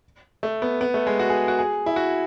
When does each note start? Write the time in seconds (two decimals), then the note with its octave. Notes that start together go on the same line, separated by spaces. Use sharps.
0.43 A3
0.62 B3
0.81 B3
0.94 A3
1.07 G#3
1.19 F#4
1.30 G#4
1.48 F#4
1.59 G#4
1.86 E4
1.96 F#4